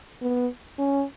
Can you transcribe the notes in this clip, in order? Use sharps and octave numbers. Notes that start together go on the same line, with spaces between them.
B3
C#4